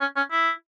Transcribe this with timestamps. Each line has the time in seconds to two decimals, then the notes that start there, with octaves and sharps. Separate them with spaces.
0.01 C#4
0.16 C#4
0.31 E4